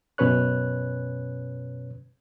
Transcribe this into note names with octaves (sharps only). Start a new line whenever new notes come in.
F#2 B2 C#4 B4 C#5 F#6